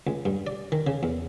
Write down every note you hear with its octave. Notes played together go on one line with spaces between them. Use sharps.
C#2
G2
D5
D#3
C#3
E2